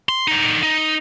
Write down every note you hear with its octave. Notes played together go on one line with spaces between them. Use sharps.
C6
D3 D#4
D#4